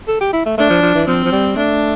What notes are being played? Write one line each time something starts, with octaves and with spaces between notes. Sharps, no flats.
A4
G4
E4
A3
A3 D4
F3
F3
E3
F3 C4
F3
G3
A3 D4